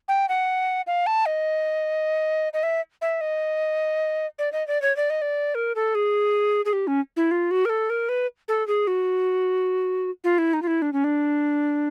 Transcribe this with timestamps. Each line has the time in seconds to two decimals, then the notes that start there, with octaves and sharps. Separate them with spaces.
0.08 G5
0.29 F#5
0.87 F5
1.06 A5
1.26 D#5
2.53 D#5
2.63 E5
3.01 E5
3.21 D#5
4.39 D5
4.52 D#5
4.67 D5
4.82 C#5
4.96 D5
5.10 D#5
5.22 D5
5.55 A#4
5.75 A4
5.95 G#4
6.65 G#4
6.73 G4
6.87 C#4
7.16 E4
7.31 F4
7.51 F#4
7.65 A#4
7.69 A4
7.90 A#4
8.09 B4
8.48 A4
8.67 G#4
8.87 F#4
10.24 F4
10.38 E4
10.53 D#4
10.62 F4
10.67 E4
10.82 D4
10.93 C#4
11.04 D4